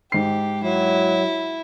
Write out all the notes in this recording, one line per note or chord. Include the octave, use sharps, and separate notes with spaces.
G#2 G4 C7
F#3 E4